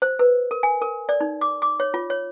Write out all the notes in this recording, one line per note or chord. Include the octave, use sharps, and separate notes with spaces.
C5
B4
A#4
G#5
A#4
D5
D#4
D6
D6
C#5
F4
C#5